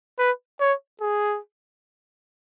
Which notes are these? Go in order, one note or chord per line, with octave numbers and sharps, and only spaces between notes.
B4
C#5
G#4